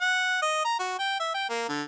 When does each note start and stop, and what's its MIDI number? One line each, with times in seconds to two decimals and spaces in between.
0.01 0.39 78
0.42 0.64 75
0.64 0.76 82
0.79 0.97 66
0.99 1.19 79
1.20 1.33 76
1.34 1.49 79
1.49 1.67 58
1.69 1.83 50